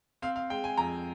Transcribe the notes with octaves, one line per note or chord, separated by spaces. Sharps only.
C4 F5
F5
G#3 G5
G#5
F2 A#5